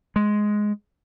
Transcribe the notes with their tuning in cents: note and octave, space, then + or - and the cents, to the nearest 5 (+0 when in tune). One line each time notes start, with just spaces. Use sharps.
G#3 +5